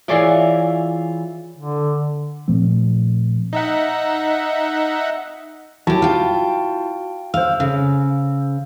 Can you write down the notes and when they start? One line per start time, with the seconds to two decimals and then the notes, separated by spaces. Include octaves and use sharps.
0.08 E3 F4 G#4 C#5 D5 E5
1.58 D3
2.48 A#2 F3 A3 C4
3.53 D#4 E5 F#5
5.87 F#3 E4 F#4 G4 A5
6.02 F4 G5
7.34 C5 F5 E6
7.60 C#3